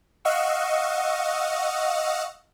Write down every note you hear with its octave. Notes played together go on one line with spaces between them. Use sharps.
D#5 F5 F#5 C#6 E6